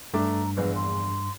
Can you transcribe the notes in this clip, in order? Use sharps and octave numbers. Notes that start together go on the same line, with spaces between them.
G2 A3 D4 A#5 D6
A#1 E2 B4
C6